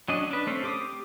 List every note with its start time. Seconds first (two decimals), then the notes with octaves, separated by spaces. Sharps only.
0.08 F#3 C#4 D4 D#5
0.31 D4 B4
0.47 A3 C4 C#4
0.64 G4 D6 D#6